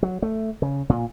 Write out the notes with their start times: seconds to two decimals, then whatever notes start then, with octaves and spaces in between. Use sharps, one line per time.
0.03 F#3
0.22 A3
0.62 C#3
0.89 A#2